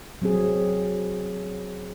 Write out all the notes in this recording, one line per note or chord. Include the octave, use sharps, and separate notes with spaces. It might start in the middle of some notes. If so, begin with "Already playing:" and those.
F#3 C4 G#4